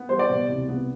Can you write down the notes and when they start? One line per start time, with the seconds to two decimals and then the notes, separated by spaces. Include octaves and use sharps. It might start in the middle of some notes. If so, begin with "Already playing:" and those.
Already playing: B3
0.09 G3 C5
0.19 D5
0.30 B2
0.49 C2
0.69 B3